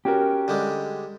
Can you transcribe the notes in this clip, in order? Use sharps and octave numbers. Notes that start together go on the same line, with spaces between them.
C#4 F#4 G4 A#4
D3 G3 G#3